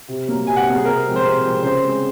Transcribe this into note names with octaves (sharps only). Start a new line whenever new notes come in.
C3
F#3 A#3
C3 G#5
F#5
F#3 A#3
G#4
C3 A#4
F3 G#3 C4
C5
C3 A#4
F3 G#3 C4
C#3 C5
G#3 C4